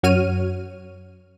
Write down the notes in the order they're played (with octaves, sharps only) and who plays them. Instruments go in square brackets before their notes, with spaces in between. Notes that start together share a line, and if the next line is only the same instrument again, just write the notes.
[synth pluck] F#2 F#4 C#5 F6 D#7